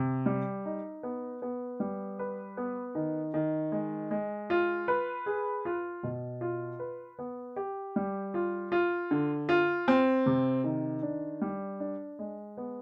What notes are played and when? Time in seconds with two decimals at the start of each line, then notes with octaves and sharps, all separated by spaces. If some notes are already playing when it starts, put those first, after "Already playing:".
Already playing: C3
0.26 G3
0.65 D#4
1.03 B3
1.42 B3
1.80 G3
2.19 B4
2.57 B3
2.95 D#3
3.34 D#3
3.72 G#3
4.11 G#3
4.50 F4
4.88 B4
5.26 G#4
5.65 F4
6.03 B2
6.41 F4
6.79 B4
7.19 B3
7.56 G4
7.96 G3
8.34 F4
8.72 F4
9.11 D3
9.49 F4
9.88 C4
10.26 C3
10.64 D#3
11.02 D4
11.41 G3
11.80 D4
12.19 G#3
12.57 B3